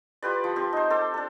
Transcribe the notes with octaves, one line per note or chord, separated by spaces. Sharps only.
F4 G4 B4 D5
F3
C4 G4
D#4 C5
A4 G5 D6
D4 A4